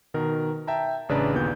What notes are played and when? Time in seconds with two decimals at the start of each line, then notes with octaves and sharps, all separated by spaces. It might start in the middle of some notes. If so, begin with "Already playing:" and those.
0.14 B2 D#3 A#4
0.67 E5 G5 A5 A#5
1.09 A1 C#3 D4 B4 D5 A#5
1.34 D#2 A#2 B3 G6